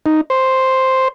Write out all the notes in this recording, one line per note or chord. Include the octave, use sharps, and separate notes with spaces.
D#4
C5